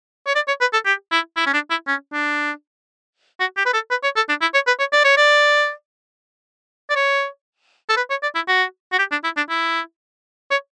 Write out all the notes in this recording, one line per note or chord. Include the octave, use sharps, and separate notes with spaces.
C#5
D5
C#5
B4
A4
G4
E4
E4
C#4
D4
E4
C#4
D4
F#4
G4
B4
A4
B4
C#5
A4
D4
E4
C#5
B4
C#5
D5
C#5
D5
D5
C#5
A4
B4
C#5
D5
E4
F#4
F#4
G4
D4
E4
D4
E4
C#5